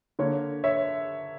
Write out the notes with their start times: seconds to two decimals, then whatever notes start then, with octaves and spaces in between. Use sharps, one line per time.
0.19 D3 A#3 A#4 C#5
0.64 C#5 E5